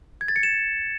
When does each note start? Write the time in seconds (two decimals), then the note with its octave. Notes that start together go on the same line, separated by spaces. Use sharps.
0.21 G#6
0.28 A6
0.36 C#7
0.43 E7